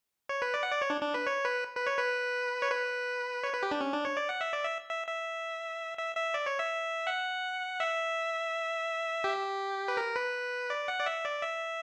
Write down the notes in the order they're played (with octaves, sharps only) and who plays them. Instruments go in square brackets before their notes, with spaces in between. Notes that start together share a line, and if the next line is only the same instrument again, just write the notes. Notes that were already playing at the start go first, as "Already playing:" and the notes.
[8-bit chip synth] C#5
B4
D5
F#5
D5
C#5
D4
D4
B4
C#5
B4
B4
C#5
B4
C#5
B4
C#5
B4
G4
D4
C#4
D4
C#5
D5
F#5
E5
D5
E5
E5
E5
E5
E5
D5
C#5
E5
F#5
E5
G4
B4
A#4
B4
D5
F#5
D5
E5
D5
E5